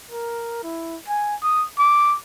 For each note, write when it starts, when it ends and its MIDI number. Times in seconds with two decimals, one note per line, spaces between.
0.11 0.60 70
0.63 0.97 64
1.08 1.35 80
1.42 1.65 87
1.79 2.16 86